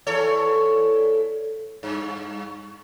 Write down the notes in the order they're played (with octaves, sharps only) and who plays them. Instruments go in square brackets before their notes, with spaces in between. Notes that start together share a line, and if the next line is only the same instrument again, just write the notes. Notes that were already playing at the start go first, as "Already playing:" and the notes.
[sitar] E2 A4 C#5
G2